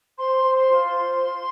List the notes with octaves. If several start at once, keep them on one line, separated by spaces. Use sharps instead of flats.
C5 C6
C5
C6
F4
C5
F4